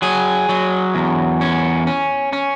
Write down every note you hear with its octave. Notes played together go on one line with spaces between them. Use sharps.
F#3 G#4
F#3
E2
C#4
C#4
C#4